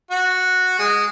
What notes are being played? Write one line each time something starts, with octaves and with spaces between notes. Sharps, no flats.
F#4
G#3